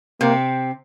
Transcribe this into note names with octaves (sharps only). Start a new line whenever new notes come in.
C3 A#3 C4